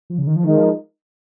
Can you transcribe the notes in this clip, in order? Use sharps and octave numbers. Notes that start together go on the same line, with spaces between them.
F3
C#3
D#3
F3
D#3 G#3 D#4 A#4
F3